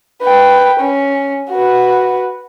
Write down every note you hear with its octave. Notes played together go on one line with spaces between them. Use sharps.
B4 G5
C#4
F#4 B4